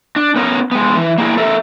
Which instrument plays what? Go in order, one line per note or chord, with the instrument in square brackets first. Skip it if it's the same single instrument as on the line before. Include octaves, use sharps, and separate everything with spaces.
[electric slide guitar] D4
B3 C#4 A#4
G#3 B3
E3
A#3 D4 E4 G#4 A#4
A4 A#4 E5